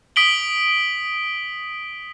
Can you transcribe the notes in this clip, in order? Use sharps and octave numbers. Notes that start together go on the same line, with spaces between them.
D#6 B6 D7 F#7 G7